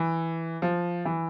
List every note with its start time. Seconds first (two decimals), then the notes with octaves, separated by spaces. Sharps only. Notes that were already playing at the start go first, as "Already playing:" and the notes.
Already playing: E3
0.62 F3
1.05 E3